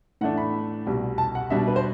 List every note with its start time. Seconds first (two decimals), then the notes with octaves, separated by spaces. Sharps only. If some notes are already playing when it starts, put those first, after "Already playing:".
0.21 A2 E3 A3 D4 F#5
0.38 B5
0.87 C2 B2 G3
1.18 A5
1.35 F#5
1.50 B2 G3 D4 E5
1.67 B4
1.76 C5